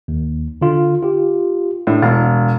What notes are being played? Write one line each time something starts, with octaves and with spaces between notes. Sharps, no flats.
D#2
D3 F4
F4 G4
A2 D4
E1 F5